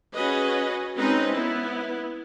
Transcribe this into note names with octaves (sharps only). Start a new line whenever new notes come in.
C#4 F#4 G#4 B4 D#5
G#3 C4 C#4 D#4 B4 D#5
B3 E4